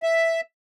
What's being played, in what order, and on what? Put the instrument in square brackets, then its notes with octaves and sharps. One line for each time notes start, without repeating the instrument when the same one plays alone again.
[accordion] E5